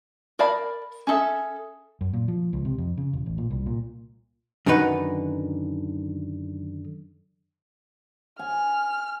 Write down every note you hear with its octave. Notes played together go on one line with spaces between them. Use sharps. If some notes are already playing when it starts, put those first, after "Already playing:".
A#4 D5 F5 A5 B5
C#4 G#4 A4 E5
F#2
A#2
F3
C#2
C3
F2
C#3
E1
A1
A#2
C2
A#2
F#2 D3 D#3 D#4 B4 F#5
G#5 F6